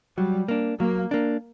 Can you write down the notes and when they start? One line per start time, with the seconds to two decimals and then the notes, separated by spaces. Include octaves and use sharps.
0.17 F#3 G3
0.48 A#3 D4
0.79 F#3 A#3
1.11 A#3 D4